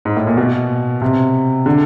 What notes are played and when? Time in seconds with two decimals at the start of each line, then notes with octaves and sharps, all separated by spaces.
0.05 G#2
0.16 A2
0.27 A#2
0.37 B2
1.02 C3
1.66 D3